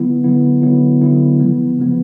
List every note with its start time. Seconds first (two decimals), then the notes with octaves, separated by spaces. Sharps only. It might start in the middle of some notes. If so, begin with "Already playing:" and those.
Already playing: D3 F#3 B3 E4
0.24 D3 F#3 B3 E4
0.62 D3 F#3 B3 E4
1.01 D3 F#3 B3 E4
1.39 C#3 F3 G#3 B3
1.79 C#3 F3 G#3 B3